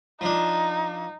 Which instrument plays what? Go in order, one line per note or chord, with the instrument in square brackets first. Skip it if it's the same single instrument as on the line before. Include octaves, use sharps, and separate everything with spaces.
[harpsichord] F3 D4 [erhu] D#4